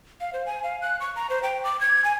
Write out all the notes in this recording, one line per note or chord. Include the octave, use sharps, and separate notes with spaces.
F5
C5
G#5
F5
F#6
C#6
A#5
C5
G5
D6
G#6
G#5